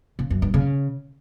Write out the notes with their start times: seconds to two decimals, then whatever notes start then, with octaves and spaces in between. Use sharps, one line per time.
0.19 C#3
0.30 F#2
0.42 G2
0.54 C#3